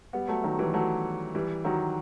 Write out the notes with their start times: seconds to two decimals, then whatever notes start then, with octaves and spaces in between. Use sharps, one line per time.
0.13 G3 B3
0.28 F#3 A3
0.44 D#3 F#3
0.59 E3 G3
0.74 F#3 A3
1.35 E3 G3
1.65 D#3 F#3